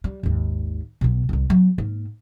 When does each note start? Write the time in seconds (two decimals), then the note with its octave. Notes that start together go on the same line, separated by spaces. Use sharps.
0.04 G3
0.23 G#1 D#2
1.01 B1 B2
1.29 D1 C2
1.49 F#3 B3
1.78 G#2 A#3